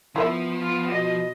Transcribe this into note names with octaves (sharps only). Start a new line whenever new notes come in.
F3 B3 E4 A#4 E5
F4
B2 D#5